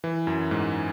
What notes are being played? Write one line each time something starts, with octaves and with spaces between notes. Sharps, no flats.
E3
F#2
G#2